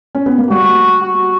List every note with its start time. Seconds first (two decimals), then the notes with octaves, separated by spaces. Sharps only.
0.15 C#4
0.26 B3
0.38 A#3
0.50 G3 F#4
1.03 F#4